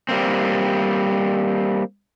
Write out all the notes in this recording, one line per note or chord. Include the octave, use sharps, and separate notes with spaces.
G3 A#3 C4